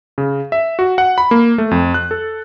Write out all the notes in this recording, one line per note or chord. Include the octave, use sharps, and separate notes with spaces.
C#3
E5
F#4
F#5
B5
A#3
A3
F2
F#6
A4